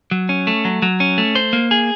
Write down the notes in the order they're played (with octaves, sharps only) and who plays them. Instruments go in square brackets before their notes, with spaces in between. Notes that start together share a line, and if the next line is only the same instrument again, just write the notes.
[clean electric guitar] F#3
C#4
A3
F#3
F#3
C#4
A3
C5
A#3
G#4